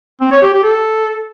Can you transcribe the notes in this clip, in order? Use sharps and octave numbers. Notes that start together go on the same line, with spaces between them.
C4
C#5
G4
G4
A4